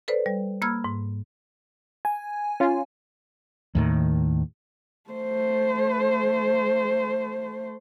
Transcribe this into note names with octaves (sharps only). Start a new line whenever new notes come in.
A4 B4 C5 D5
G3
A#3 B5 E6 F6 G#6
G#2
G#5
C#4 F4
D#2 A2 D#3
A3 C5